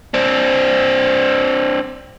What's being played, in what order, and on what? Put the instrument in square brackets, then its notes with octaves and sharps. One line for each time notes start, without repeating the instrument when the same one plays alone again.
[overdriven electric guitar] C4 D4